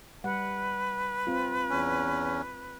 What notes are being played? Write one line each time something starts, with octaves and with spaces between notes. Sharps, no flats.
G3 B4 F#5
C4 F4
E2 C#4